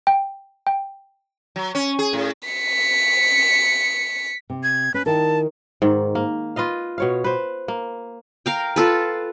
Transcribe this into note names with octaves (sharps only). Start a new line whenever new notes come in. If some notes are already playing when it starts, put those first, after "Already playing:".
G5
G5
F#3
C#4
G#4
A2
B6 C#7
C3
G#6
C#4 B4
D#3 E4 A#4 A5
G#2 D#3
A#3
F4 B4 D#5 F5
B2 C#5 F5
B4 C5
A#3
A#4 F5 G5
F4 A4 B4